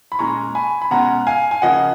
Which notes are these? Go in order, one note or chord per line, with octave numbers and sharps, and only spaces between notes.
B5
A#2 G#3 C#4 A#5 C#6
G#5 B5
B5
B2 G#3 C#4 F#5 A#5
F5 G#5
G#5
C#3 F3 A#3 C#4 D#5 F#5